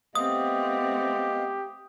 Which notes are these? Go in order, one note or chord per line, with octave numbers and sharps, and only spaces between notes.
A3 B3 C4 G4 D#5 F5 D#6